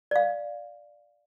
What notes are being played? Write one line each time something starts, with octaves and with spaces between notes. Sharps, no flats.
D5 F5